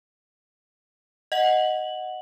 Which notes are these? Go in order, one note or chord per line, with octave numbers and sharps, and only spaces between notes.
D#5 F#5 F#7